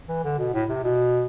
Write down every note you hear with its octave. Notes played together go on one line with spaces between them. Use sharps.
E3
D3
B2
A2
C3
B2